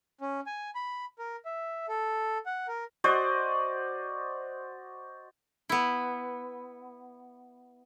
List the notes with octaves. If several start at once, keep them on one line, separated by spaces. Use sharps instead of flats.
C#4
G#5
B5
A#4
E5
A4
F#5
A#4
F#4 C5 D5 D#5
B3 E4